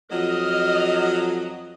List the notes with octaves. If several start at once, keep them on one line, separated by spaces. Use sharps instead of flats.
F2 F#3 D#5 F6